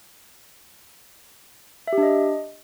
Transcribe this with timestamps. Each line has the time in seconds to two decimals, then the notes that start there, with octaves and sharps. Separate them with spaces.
1.88 E5
1.93 G4
1.98 D4
2.03 D#5